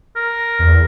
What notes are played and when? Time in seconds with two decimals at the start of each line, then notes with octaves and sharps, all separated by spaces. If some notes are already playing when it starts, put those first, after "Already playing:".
0.16 A#4
0.59 E2